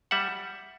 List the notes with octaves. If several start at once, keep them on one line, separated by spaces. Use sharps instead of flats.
G3 E5 F#5